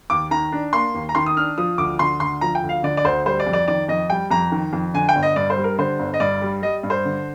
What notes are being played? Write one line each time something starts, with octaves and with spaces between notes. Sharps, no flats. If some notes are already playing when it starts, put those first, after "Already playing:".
D#2 D6
D#3 A#5
D4
A#3 C6
D#2
A#5
D#3 C6
D#6
D4 F6
F3 D#6
D2 D6
D3 C6
D2 C6
F3 A#5
G5
D2
F5
D3 D5
D5
D2 C5
G3 C5
D5
F2
D5
D#3 D5
F2 D#5
G3 G5
F2 A#5
D#3
F2
D3 G#5
G5
G1
D#5
G2 D5
C5
G3
A#4
D3 C5
G1
D#5
G2 D5
G3
G3 D#5
G2
C5
D3